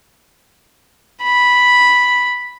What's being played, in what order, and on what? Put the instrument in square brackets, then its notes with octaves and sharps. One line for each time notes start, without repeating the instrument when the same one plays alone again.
[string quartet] B5